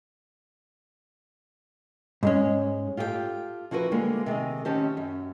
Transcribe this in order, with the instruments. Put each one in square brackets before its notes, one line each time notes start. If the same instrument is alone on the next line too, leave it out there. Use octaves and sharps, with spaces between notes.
[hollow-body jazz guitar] G#2 G#3 C#4
[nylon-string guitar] F4 G4 A4 D#5 G5
F3 E4 F#4 A#4 B4
D3 G3 G#3 A#3
C3 D#3 G#4 D#5
D#3 C4 C#4 G4 A5
F#2